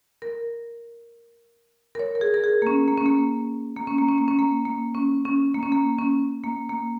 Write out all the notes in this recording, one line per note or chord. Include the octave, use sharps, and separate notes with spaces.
A#4
A#4
C#5
A#4
G#4
A#4
G#4
A#3
C#4
A#3
C#4
A#3
A#3
C#4
A#3
C#4
A#3
C#4
A#3
A#3
C#4
C#4
A#3
C#4
A#3
C#4
A#3
A#3